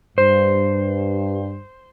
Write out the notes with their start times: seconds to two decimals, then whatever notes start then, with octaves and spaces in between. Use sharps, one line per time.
0.18 G2 C5